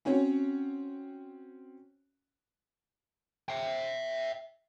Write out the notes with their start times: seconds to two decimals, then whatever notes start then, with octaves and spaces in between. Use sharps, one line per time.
0.05 C4 C#4 F#4 C#5
3.49 E5 G5